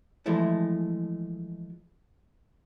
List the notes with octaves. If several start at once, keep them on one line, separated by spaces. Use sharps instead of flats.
E3 F3 G#3 A3 E4